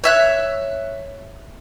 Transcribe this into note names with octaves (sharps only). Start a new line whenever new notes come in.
C#5 E5 F#6